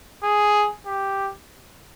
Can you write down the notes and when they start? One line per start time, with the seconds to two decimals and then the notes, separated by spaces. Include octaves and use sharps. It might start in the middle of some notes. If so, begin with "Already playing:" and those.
0.23 G#4
0.86 G4